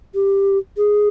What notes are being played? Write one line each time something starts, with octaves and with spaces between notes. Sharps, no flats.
G4
G#4